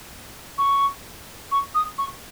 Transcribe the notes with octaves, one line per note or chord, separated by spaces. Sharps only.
C#6
C#6
D#6
C#6